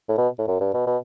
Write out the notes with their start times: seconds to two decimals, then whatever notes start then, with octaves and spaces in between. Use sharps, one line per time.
0.08 A2
0.17 B2
0.38 A2
0.47 F#2
0.60 G2
0.74 B2
0.87 B2